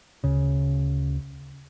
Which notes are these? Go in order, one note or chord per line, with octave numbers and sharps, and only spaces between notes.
D2 C#3